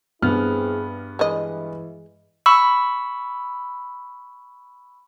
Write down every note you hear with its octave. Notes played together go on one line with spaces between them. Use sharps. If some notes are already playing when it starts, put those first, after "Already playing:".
G2 B3 C4 E4 G#4 F6
E3 G#3 D#5
B5 C#6 E6